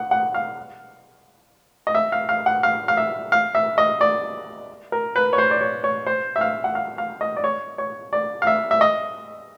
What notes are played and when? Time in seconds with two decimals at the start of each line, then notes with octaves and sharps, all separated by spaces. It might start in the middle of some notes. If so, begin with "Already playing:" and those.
Already playing: F#5
0.11 F#5
0.34 F5
1.87 D#5
1.95 E5
2.12 F5
2.29 F5
2.46 F#5
2.63 F5
2.88 F5
2.97 E5
3.32 F5
3.55 E5
3.78 D#5
4.01 D5
4.92 A#4
5.16 B4
5.33 C#5
5.38 C5
5.51 D5
5.61 C#5
5.84 C#5
6.06 C5
6.36 E5
6.41 F5
6.64 F#5
6.75 F5
6.98 F5
7.21 D#5
7.37 D5
7.44 C#5
7.78 C#5
8.13 D5
8.42 F5
8.47 E5
8.71 E5
8.81 D#5